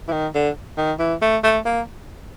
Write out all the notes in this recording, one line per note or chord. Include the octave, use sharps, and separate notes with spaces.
E3
D#3
D3
D#3
E3
A3
A3
A#3